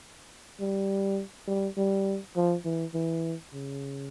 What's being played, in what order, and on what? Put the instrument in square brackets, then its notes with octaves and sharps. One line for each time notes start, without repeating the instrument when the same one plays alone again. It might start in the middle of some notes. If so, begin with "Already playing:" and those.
[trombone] G3
G3
G3
F3
E3
E3
C#3